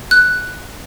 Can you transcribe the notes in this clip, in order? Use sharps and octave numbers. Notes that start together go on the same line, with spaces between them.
F#6